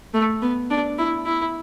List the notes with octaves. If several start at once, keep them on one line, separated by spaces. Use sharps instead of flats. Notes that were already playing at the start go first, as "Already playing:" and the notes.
A3
B3
D4
E4
E4